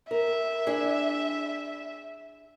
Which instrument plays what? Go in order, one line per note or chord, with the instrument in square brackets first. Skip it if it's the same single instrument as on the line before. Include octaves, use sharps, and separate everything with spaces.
[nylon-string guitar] A#4 [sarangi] E5
[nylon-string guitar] D4 E4 G#4